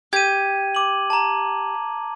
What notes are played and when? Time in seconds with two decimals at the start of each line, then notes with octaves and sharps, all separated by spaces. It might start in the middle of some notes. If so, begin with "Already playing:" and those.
0.13 G4 G#6 D#7
0.75 D6 F#7
1.10 A5 A#5